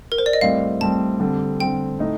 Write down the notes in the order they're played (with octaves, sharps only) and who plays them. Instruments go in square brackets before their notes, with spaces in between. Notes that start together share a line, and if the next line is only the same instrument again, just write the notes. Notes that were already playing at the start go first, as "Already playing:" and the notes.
[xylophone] A#4
C5
D5
D#5
[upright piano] A2 G3 C4 [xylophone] F5
[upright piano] A2 G3 C4 [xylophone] A5
[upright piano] D3 G3 C4
[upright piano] D3 G3 C4 [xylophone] G5
[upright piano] A2 A3 D#4